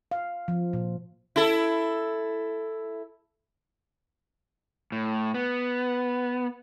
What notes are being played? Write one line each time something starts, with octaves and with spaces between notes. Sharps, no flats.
F5
F3
A#2
E4 A4
A2
B3